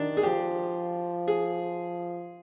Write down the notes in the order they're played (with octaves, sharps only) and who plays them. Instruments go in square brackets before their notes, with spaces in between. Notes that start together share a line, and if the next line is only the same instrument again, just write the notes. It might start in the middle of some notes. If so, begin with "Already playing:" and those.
Already playing: [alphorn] D#3 [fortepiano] D4
[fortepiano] G#4
[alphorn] F3 [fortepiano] G4
[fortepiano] G#4